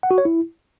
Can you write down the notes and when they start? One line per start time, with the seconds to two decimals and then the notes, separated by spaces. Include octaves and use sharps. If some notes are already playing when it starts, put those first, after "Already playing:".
0.03 F#5
0.11 F#4
0.18 C#5
0.25 E4